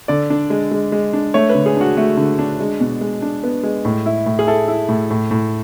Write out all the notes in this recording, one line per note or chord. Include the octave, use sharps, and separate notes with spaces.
D3 D5
D4
G#3
G#3
G#3
D4
A3 C#5
B4
D3
G#4
D4 F#4
A3 F#4
D3
D4
G#3
B2
G#3
D4
B3
G#3
A2
E4
A2
G#4
E4 A4
E4
A2
A2
A2